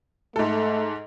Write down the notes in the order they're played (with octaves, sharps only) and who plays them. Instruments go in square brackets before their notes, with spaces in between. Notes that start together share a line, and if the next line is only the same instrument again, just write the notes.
[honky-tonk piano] G#2 A4 [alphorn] A3